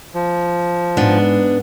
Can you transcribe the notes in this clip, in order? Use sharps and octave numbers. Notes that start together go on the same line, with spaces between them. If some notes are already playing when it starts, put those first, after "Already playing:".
F3
G#2 B3 D4